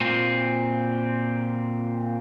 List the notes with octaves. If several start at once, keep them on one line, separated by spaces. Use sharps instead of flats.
A#2 C4